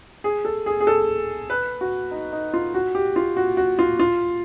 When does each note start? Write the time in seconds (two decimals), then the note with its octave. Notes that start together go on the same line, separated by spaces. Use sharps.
0.24 G#4
0.45 A4
0.66 G#4
0.80 G#4
0.87 A4
1.50 B4
1.81 F#4
2.11 D#4
2.33 D#4
2.54 F4
2.74 F#4
2.95 G4
3.16 F4
3.37 F#4
3.57 F#4
3.79 F4
4.00 F4